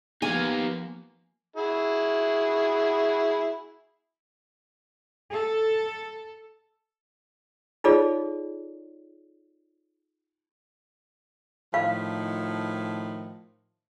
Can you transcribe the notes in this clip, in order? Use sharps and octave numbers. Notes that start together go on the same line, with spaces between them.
F3 A#3 B3 D#4 G4 F5 G#5
E4 F#4 G#4
A4
D#4 F4 G#4 A4 C#5 D5
A2 D#3 F3 F5